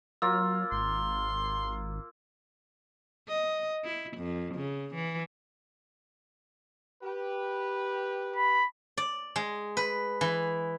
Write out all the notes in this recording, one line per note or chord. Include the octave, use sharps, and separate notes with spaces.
F#3 A#3 F4 E6
G#1 C6
D#5
E4
F2
C#3
E3
G4 B4
B5
D5
G#3
B4
E3